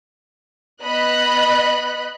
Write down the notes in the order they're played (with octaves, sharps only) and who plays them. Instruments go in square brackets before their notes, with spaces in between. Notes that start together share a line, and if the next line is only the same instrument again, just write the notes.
[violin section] B3 D#5 B5 F#6